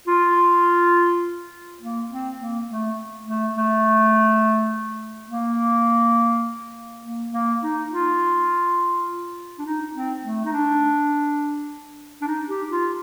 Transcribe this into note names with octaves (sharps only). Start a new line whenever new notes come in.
F4
A#3
C4
A#3
A3
A3
A3
A#3
A#3
A#3
D#4
F4
D4
D#4
C4
A3
D#4
D4
D4
D#4
G4
F4